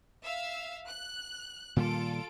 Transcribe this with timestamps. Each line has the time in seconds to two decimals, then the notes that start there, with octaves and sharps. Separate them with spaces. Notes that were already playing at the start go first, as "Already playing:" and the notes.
0.24 E5 F5 E6
0.87 F#6
1.76 A#2 D#3 G3 F4 A4 D7